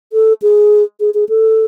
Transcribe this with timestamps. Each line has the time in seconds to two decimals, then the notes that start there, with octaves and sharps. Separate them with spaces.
0.13 A4
0.42 G#4
1.00 G#4
1.14 G#4
1.29 A4